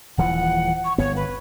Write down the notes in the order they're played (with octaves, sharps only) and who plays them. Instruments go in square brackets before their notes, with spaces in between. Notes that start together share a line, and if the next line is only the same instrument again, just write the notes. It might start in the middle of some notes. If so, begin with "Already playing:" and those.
[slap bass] D#1 E3 F3 [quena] F#5
[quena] C#6
[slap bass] G1 B3 [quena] C#5
[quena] B4